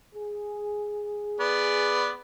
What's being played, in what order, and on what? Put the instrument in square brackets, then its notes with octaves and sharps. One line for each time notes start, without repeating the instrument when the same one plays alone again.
[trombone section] G#4
[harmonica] B3 D5